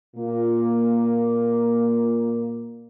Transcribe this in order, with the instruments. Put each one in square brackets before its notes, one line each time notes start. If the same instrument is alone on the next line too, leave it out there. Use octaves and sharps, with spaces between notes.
[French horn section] A#2 A#3